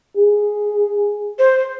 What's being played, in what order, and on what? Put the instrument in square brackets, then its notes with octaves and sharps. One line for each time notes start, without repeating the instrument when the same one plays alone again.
[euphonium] G#4
[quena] C5